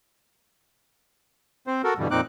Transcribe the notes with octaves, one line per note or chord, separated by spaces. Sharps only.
C4 C5
F#4 A4 A#4
G2 B2 D3 E3 G3
F2 A#2 C4 D#4 D6 F#6